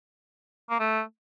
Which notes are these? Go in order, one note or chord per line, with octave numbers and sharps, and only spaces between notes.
A#3
A3